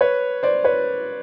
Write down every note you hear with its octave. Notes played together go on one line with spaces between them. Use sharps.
B4 C#5
C5 D5
B4 C#5